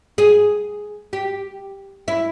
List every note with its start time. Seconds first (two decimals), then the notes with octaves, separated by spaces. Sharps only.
0.18 G#4
1.13 G4
2.08 E4